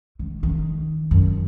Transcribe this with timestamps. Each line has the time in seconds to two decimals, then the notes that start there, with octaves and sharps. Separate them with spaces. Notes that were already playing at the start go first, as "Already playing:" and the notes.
0.19 D#3
0.43 D#3
1.11 F#2